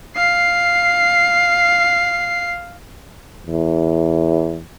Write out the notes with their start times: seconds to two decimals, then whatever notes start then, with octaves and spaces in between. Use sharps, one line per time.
0.16 F5 C7
3.46 E2